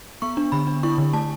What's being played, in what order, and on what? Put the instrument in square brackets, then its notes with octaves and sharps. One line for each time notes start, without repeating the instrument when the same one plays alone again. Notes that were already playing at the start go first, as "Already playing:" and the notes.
[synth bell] B3 C#6
D4
D3 B5
D4
E4 C#6
D3
A3 A5